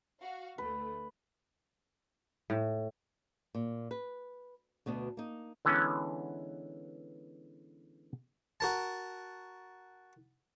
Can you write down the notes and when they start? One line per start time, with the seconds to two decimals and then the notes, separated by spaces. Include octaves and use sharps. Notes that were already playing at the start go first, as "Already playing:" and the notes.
0.20 F#4 F5
0.58 D2 A3 B4
2.50 A2
3.55 A#2
3.91 B4
4.86 D2 B2 B3 D4
5.17 A#3 D#4
5.65 D3 E3 G#3 B3 C#4
8.60 F#4 A#4 A5